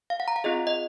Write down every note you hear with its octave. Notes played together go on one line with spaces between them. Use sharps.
F5
F#5
A#5
F#5
C4 F4 G#4 D#5
D#5